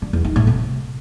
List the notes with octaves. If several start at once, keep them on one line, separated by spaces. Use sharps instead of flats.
D3
E2
D#3
A2
C3